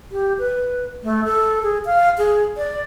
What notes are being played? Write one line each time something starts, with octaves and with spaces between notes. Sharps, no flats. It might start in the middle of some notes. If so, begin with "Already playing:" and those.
G4
B4
A3
A4
G#4
F5
G#4
D5